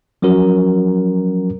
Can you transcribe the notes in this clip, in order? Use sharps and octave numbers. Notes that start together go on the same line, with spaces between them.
F3 F#3 C#4 F#4 A#4